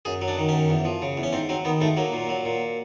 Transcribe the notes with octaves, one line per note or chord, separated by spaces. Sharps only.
F#2 G#4
F#3
D4
D#3
F#2 C#4
E2
F3
C#3
E2
C#4
G#2 C4
F#3 C4
D#3 B3
G#2 A3
F#3 A#3
A#2
F#3
A#2